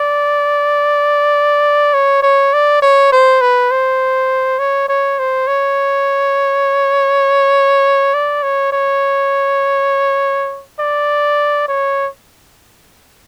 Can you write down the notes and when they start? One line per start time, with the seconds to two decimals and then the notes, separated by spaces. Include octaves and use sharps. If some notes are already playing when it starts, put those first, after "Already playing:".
Already playing: D5
1.94 C#5
2.23 C#5
2.53 D5
2.82 C#5
3.12 C5
3.41 B4
3.71 C5
4.59 C#5
4.89 C#5
5.19 C5
5.47 C#5
8.14 D5
8.43 C#5
8.72 C#5
10.80 D5
11.68 C#5